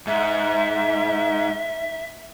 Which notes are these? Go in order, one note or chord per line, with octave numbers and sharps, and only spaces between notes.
G#2 E5